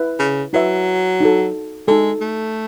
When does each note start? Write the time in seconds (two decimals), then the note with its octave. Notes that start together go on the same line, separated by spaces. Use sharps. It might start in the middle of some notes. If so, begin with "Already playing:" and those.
Already playing: E4 B4 E5
0.19 C#3
0.53 F#3 E4 B4 E5
1.20 D#4 F#4 A4
1.88 G#3 D#4 F#4 A4
2.21 A3